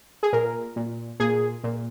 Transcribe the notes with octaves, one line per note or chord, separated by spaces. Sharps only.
G#4
A#2 A#4
A#2
A#2 G#4
A#2